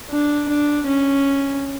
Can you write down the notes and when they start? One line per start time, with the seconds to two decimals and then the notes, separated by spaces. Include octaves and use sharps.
0.10 D4
0.49 D4
0.87 C#4